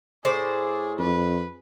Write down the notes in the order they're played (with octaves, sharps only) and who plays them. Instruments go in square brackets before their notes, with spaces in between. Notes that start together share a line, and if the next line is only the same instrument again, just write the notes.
[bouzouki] A2 C5 D5 [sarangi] G#4
[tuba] F2 [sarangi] B4